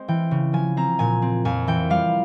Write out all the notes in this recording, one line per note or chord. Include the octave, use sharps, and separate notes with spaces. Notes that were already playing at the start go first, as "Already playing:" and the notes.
Already playing: G#3 C4 C5
E3 G5
C#3
F3 G#5
C4 A#5
A#2 G#5
C4
F2 G#5
E3 G5
G3 F5